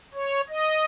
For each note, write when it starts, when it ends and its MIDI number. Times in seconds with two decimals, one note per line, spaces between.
0.14 0.41 73
0.49 0.85 75